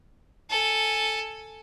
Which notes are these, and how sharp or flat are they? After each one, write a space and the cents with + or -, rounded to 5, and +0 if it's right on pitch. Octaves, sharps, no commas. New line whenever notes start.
A4 +0 G#5 +5